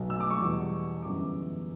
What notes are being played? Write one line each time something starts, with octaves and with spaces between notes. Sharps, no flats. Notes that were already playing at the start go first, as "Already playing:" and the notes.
Already playing: B1 B2 F#3
E6
D6
C#6
E2 B2 G3
G1 F#2 E3 G3 D6